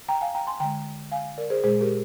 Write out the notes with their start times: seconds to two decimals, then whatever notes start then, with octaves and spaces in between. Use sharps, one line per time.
0.08 G5 A#5
0.21 F5 G#5
0.34 G5 A#5
0.47 G#5 C6
0.60 D3 G#3 G5 A#5
1.12 F5 G#5
1.38 A#4 D5
1.50 G#4 C5
1.63 A#2 G#3 G#4 C5
1.80 G4 A#4